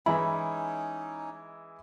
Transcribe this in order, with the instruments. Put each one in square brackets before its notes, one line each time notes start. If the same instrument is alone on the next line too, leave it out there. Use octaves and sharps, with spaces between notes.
[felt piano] E3 G#3 E4 [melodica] C#4 D#4 [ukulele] B5